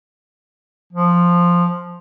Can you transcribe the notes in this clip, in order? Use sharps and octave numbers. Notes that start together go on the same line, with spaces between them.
F3